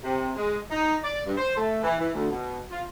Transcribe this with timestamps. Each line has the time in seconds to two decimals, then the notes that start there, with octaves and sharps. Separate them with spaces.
0.04 C3
0.36 G#3
0.71 D#4
1.04 D5
1.26 G2
1.37 C5
1.57 A3
1.84 E3
1.99 E3
2.14 D2
2.31 B2
2.71 F4